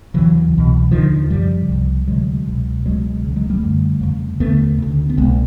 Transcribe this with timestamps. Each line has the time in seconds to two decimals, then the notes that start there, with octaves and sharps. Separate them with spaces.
0.14 D#2 C#3 E3 F#3
0.53 C2 B2
0.91 D#2 D3 D#3 F3
1.11 D#3
1.30 F#2 C#3 F3 G3
1.69 C2 C3
2.07 D2 C3 F#3 G#3
2.47 C#2 B2
2.86 C#2 B2 F#3 G#3
3.24 C#2 C#3
3.36 F#3 G#3
3.50 G3 A3
3.63 F#2 D3
4.01 F2 C#3
4.40 D#2 D3 A3 B3
4.78 D2 C#3
5.09 B3
5.17 C2 B2 G#3 A#3